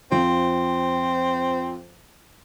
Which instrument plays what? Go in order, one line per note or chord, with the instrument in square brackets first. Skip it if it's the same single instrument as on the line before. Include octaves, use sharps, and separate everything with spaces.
[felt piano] F2 F3 [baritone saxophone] C4